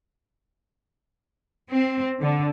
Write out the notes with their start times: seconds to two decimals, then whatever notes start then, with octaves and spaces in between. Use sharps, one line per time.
1.69 C4
2.20 D3